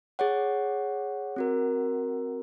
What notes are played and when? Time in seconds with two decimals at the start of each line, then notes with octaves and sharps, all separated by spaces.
0.19 G#4 C#5 F#5
1.36 C4 F#4 A#4